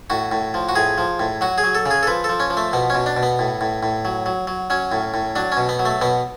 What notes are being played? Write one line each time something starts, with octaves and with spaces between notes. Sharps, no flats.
A2 F#4
A2
F3
F#4
A2 G#4
F3
A2
F#3 F#4
G#4
F#3
A4
C#3 G#4
A4
F3 B4
F3 A4
C#4
F3
A3
B2 B3
B2 C#4
D4
B2
B3
A2
A2
A2
F#3
F#3
F#3
F#3 C#4
A2
A2
F#3 D4
C#4
B2
B3
F#3
A3
B2 B3